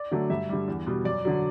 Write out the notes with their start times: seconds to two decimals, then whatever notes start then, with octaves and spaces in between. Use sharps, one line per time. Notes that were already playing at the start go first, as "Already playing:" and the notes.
Already playing: D5
0.11 D3 F#3 A3
0.30 G2 E5
0.49 D3 G3
0.68 E2
0.86 B2 G3
1.05 F#2 D5
1.25 D3 F#3